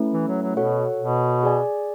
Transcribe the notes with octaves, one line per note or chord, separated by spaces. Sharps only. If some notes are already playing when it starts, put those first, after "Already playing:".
Already playing: A3 C#4 E4 B4
E3
F#3
F#3
B2 F#4 A4 C#5 F#5
B2
G#4 D5 G#5